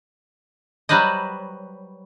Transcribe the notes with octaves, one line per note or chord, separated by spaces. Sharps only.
F#3 G3 B4 C5 D#5